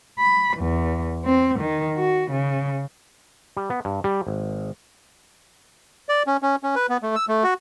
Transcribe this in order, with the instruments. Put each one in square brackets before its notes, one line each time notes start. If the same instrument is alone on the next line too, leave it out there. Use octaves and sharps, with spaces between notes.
[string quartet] B5
E2
C4
D#3
F#4
C#3
[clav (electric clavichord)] G3
B3
G2
G3
G#1
[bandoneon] D5
C#4
C#4
C#4
B4
B3
A3
E6
A3
F#4